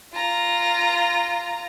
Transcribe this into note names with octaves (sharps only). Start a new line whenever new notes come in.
F4 A#5